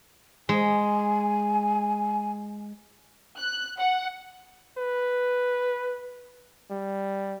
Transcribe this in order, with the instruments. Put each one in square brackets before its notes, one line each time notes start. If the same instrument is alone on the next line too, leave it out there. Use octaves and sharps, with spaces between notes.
[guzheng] G#3 [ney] G#5
[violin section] F#6
F#5
[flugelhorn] B4
G3